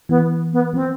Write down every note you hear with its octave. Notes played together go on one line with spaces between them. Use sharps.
E3 B3
B3
F3 C4